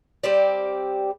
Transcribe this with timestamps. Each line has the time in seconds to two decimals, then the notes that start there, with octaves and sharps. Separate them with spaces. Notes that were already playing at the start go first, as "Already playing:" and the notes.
0.23 G3 C4 G4 D5